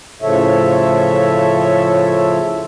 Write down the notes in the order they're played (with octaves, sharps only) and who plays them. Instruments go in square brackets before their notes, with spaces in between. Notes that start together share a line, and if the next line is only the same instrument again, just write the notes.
[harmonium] A2 C#3 F3 A4 C#5 E5